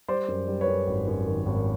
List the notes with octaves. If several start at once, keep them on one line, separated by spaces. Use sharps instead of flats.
G3 C5 D5
F#2
G3
B4 C#5
F#2
G#1
F#2
D#3
G#1